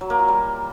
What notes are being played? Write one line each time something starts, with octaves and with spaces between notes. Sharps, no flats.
F#3
A#3
F4
G3